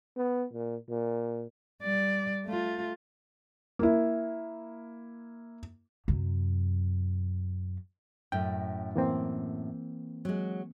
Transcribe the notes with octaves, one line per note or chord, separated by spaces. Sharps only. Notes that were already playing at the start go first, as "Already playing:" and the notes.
B3
A#2
A#2
G3 D5
A3 F4
A#3 E4
F#2 C3
F#2 A2 G5
E3 A#3 C4
F#3 G#3